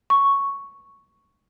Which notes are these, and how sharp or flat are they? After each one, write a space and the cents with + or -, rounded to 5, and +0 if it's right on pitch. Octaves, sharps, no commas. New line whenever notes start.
C#6 +0